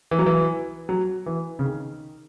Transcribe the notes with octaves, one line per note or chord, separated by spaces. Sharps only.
E3
F#3
E3
F#3
E3
C#3
D#3